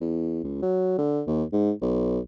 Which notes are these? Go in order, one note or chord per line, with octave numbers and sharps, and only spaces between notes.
E2
C#2
F#3
D3
D#2
G#2
B1